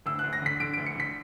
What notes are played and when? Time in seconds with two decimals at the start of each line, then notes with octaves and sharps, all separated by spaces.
0.06 D2 E6
0.19 D2 F#6
0.33 A#6
0.42 D3 B6
0.60 D3 D7
0.74 D2 D7
0.86 C#7
0.96 D3 B6